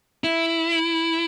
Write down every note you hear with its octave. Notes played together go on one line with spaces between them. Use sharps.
E4